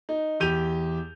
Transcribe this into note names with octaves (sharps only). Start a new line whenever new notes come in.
D#4
E2 G4 G6 D#7 F7